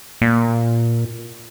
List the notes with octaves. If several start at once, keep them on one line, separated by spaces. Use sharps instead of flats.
A#2